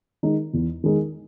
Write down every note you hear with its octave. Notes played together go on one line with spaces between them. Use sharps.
D#3 G#3 D#4
E2
D#3 G#3 D#4